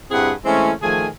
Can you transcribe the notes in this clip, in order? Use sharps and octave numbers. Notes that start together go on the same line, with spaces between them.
G2 C4 E4 G#4 B4 F#5
E3 G#3 A3 C4 C#4
D#3 F3 A3 G#4 G#5